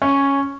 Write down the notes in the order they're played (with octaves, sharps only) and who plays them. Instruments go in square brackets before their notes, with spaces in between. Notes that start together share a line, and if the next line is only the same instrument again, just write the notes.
[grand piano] C#4